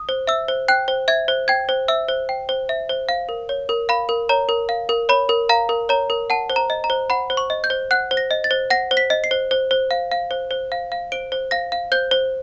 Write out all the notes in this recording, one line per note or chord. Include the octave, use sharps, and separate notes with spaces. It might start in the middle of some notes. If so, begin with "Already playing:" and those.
Already playing: D#6
C5
E5 E6
C5
G5 F#6
C5
E5 G#6
C5
G5 G#6
C5
E5 E6
C5
G5
C5
E5
C5
F5
A#4
C#5
A#4
F5 B5
A#4
C#5 A#5
A#4
F5
A#4
C#5 B5
A#4
F5 A#5
A#4
C#5 A#5
A#4
F#5 A5
C5
A#5
D#5
A#5
C5
F#5 B5
C5
C#6
D#5
G6
C5
F#5 F#6
C5
A#6
D#5
A6
C5
F#5 A#6
C5
B6
D#5
C7
C5
C5
C5
F5
F5
C5
C5
F5
F5
C5 D7
C5
F5 A#6
F5
C5 G6
C5